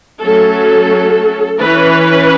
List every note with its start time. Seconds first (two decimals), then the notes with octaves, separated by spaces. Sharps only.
0.22 F#3 A3 C#4 A4
1.62 E3 C#4 B4